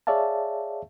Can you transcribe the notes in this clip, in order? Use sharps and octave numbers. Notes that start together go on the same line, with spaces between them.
G#4 C#5 D5 E5 F5 A5